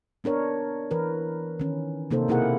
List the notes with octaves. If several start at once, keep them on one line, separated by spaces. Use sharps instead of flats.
B3 D4 A#4 C#5
E3 A#4 B4
D#3 C#4
C3 A#3 D#4 A4 C5
B2 A#3 E4 G#4 A#4 F#5